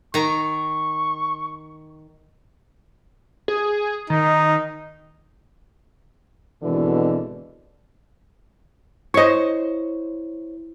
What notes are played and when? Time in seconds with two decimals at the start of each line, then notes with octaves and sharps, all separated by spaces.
0.14 D#3 A#5 C#6
3.48 G#4
4.10 D#3 D#4
6.62 G#1 B2 D3 E3
9.14 E4 C5 C#5 D#5 C#6